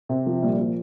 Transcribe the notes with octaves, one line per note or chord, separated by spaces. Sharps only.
C3
F3
A#2 G3
F3